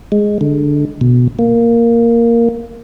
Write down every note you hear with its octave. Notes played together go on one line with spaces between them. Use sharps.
G#3
D3
B2
A#3